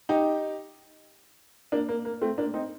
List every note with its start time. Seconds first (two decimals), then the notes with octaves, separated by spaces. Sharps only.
0.09 D#4 G4
1.72 A#3 D4
1.89 A#3
2.05 A#3
2.22 A3 C4
2.38 A#3 D4
2.54 C4 D#4